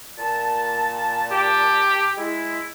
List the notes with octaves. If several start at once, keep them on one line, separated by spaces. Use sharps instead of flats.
A#2 A5
G4
G#3 E4